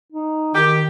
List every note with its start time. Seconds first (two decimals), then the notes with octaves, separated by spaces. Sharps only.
0.13 D#4
0.55 D#3 G4